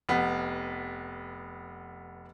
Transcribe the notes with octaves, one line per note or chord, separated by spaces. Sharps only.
F1 B3